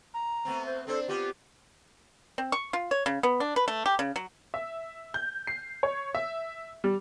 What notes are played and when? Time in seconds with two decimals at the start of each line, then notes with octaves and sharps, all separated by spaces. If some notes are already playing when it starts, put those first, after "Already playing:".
0.14 A#5
0.45 A3 B3 C4
0.66 C5
0.87 C4 D4 A4 C5
1.08 B3 C4 F4 G4
2.38 C4
2.52 C#6
2.73 F4
2.91 C#5
3.06 C#3
3.23 B3
3.40 D4
3.56 B4
3.68 A3
3.86 G4
3.99 C#3
4.16 F#3
4.54 E5
5.14 G6
5.47 C7
5.83 C#5
6.15 E5
6.84 G3